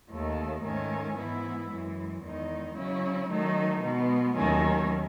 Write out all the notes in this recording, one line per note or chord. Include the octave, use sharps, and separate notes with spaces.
D#2 D#3 A3
G#2 D#3 A3 C#4
G#2 E3 B3 E4
F#2 E3 G#3
E2 D#3 G#3 D#4
C#3 F#3 C#4 E4
D#3 F#3 A3 D#4
B2 G#3 B3
D#2 D#3 F#3 A3 C#4